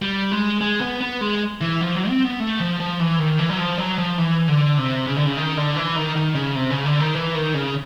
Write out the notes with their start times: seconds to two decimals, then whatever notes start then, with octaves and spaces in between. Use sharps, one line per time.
0.02 G3
0.32 G#3
0.61 G#3
0.81 B3
1.01 B3
1.21 G#3
1.61 E3
1.81 F3
1.95 F#3
2.09 C4
2.24 B3
2.40 A3
2.60 F3
2.80 F3
3.00 E3
3.19 D#3
3.39 E3
3.50 F#3
3.58 F3
3.78 F#3
3.98 F3
4.18 E3
4.48 D3
4.78 C3
5.07 C#3
5.16 D3
5.26 C#3
5.37 D#3
5.57 D3
5.76 E3
5.96 D#3
6.16 D#3
6.35 C#3
6.55 C3
6.70 C#3
6.85 D3
7.00 D#3
7.15 E3
7.35 D#3
7.54 C#3